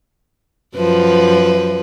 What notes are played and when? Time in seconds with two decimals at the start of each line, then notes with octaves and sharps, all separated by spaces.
0.77 F#2 F3 B4